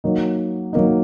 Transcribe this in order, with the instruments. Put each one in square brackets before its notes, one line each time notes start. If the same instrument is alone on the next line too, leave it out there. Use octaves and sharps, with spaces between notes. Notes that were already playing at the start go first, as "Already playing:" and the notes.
[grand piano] F#3 A#3 D#4
F#3 A#3 D#4